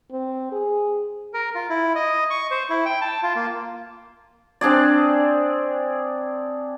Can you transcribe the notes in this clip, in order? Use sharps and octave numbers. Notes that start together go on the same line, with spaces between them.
C4
G#4
A#4
F4
E4
D#5
C#6
C5
E4
G5
A5
F4
A#3
C4 D4 G#4 D5